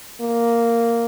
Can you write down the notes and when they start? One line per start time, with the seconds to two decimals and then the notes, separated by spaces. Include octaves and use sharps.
0.21 A#3